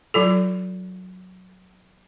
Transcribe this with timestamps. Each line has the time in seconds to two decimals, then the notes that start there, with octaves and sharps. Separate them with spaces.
0.14 F#3 F4 A4